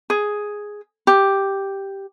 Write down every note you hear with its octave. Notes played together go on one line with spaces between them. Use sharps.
G#4
G4